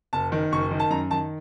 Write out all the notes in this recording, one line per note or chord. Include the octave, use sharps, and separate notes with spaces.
F#1 A5
D#3
F#1 C#6
D#3
A5
F#2 A#5
D#3 A5